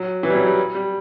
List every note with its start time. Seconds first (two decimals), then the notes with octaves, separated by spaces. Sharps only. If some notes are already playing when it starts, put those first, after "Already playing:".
Already playing: F#3
0.23 E3
0.30 G3
0.35 F#3
0.46 G3
0.74 G3